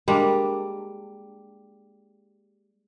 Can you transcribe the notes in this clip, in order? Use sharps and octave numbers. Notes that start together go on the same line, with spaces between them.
G3 G#3 A#3 D4